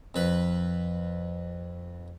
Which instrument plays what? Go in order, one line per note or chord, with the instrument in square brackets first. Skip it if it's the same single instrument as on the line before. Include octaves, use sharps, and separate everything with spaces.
[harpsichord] F2 B4